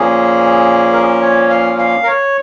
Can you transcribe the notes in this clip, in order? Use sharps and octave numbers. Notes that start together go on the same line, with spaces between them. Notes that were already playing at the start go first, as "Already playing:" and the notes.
Already playing: A#2 F3 A#3 C#4 G#4
A#4
C#5
F5
F5
A#4
C#5